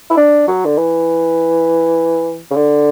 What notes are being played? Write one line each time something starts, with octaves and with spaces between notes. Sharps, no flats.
E4
D4
F#3
D3
E3
C#3
D3